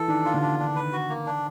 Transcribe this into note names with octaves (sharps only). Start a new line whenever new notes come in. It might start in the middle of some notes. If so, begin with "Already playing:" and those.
Already playing: E3 A4
D#3 D4
F4
D3
D4
D4
B4
F#4
A#3
D4